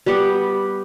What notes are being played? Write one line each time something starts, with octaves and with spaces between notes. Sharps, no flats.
G3 B3 G4 F#5